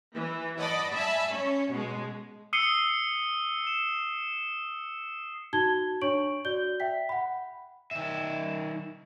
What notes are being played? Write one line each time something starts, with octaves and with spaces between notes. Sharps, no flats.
E3
D5 D#5 F#5 A5 B5 D6
E5 G#5 A5 B5
C#4
B2 G#3
D#6 E6 C7 C#7 D#7 G7
E7
D#4 F#4 A5 G#6 G7
D4 C#5 C#6 D7 F#7
F#4 D5 G6 G7
E5 G5 B6
F#5 B5
D#3 E5